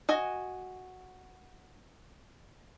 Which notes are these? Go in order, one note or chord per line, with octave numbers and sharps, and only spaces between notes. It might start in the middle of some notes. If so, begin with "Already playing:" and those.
F#4 D#5 G#5